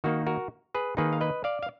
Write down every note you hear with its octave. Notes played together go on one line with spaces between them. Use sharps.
D#3 A#3 D#4 F#4
F#4 A#4
G#4 B4
D#3 A#3 D#4 G#4 B4
F5
B4 D#5
D5 F5
F5